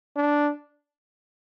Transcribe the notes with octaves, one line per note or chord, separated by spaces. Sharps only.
D4